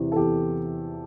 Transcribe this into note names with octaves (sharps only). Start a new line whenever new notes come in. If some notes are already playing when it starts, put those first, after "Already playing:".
Already playing: E2 C3 E3
A4
E2 G4